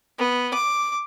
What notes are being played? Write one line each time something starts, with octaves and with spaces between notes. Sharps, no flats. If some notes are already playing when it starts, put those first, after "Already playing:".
B3
D6